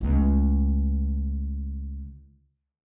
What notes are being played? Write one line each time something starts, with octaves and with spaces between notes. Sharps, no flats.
C#2 A3